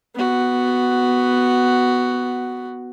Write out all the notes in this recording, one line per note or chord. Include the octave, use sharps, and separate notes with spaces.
B3 F#4